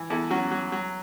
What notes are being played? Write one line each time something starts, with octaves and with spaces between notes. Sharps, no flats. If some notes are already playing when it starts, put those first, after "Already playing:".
Already playing: E3
E2 E4 A4
F#3 C#4 F#4
F#3
F#3